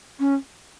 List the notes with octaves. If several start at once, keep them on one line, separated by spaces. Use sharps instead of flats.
C#4